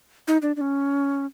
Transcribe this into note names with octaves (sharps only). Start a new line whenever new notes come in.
D#4
D4
D4
C#4